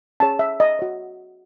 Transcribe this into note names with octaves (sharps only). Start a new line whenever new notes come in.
C#4 G#4 C#5 A5
E5
D#5
F#4 C#5